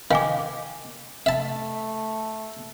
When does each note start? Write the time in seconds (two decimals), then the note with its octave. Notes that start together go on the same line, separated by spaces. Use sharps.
0.11 D#3 F5 G#5 D6
1.26 A3 E5 A5